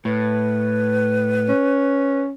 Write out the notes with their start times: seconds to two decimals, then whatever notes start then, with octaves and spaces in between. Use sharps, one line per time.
0.05 A2 B4
1.49 C#4